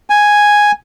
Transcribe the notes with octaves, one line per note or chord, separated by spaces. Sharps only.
G#5